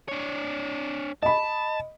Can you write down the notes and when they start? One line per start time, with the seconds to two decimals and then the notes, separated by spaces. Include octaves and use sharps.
0.08 D4 C#5
1.23 D#5 A5 B5